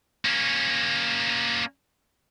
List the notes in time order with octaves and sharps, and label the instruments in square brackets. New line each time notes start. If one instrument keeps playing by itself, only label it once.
[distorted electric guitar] A#3 C#4